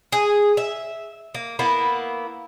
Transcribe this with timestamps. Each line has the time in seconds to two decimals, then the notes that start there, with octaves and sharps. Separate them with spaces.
0.12 G#4
0.57 E5
1.35 A#3
1.59 A#3 B3 E4